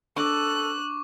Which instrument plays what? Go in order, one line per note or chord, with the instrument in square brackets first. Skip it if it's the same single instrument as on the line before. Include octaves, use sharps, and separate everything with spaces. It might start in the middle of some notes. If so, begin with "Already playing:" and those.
[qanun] D4 [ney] A4 [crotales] C#6 D6 [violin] F#6